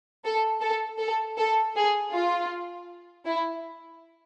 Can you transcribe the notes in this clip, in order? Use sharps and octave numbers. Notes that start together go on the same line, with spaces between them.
A4
A4
A4
A4
G#4
F4
E4